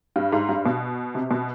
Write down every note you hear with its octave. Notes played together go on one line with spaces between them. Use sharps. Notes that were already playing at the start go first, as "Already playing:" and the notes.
G2
G#2
G2
B2
C3
B2